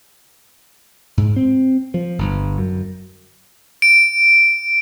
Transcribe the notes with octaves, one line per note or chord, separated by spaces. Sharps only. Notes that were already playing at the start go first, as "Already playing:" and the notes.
G#2
C4
F3
G1
F#2
D7